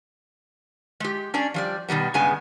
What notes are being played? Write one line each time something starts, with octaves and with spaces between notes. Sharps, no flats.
G#3 G4
C#4 D4 D5
F3 G3 D5
B2 D#3 G3 B3
G2 C#3 G#3 B3 G#5